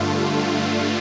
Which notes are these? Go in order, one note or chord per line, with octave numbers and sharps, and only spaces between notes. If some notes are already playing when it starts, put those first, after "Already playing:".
Already playing: G2 D3 A3 F4